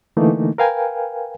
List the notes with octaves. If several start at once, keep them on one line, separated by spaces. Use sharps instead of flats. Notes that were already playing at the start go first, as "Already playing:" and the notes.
D3 E3 A3 A#3 D#4
A#4 B4 F5 G5 G#5